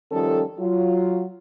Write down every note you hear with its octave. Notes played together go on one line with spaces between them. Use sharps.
D#3 F3 G3 C#4 A4
F#3 F4